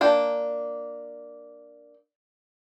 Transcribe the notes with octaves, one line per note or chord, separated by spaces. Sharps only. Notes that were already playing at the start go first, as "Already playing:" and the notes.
A#3 D4 G5